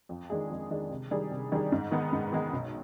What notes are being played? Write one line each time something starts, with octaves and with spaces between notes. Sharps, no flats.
F2
D#3 G#3 D4 G#4
F2
D#3 G#3 D4 G#4
C3
D#3 G3 D4 G#4
C3
D#3 G3 D4 G#4
G#2
D#3 G#3 B3
G#2
D#3 G#3 B3
B1